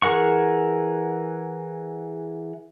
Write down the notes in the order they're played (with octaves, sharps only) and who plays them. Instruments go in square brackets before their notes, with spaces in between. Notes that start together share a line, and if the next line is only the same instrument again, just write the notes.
[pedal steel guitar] E3 G#4 A#4 F#5 C#6